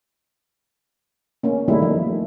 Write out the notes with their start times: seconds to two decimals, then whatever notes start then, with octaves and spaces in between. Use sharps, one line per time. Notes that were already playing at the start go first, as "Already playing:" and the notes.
1.43 A#3 C#4
1.68 D#3 G3 A3 A#3 D#4 E4
1.82 F3 A3